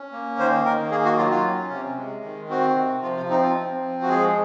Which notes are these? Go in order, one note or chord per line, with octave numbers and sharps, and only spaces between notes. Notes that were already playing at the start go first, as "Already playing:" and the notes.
Already playing: C#4
A#3
D#3 C5
D#3 A#4
A#3 G#4
F#4
F#3 F4
F4
C#4
C3
G#3
D#3
C4 F#4
C3
F3 F4
F4
C4 D#4
F4
C4
F3
F#4
G#3 G#4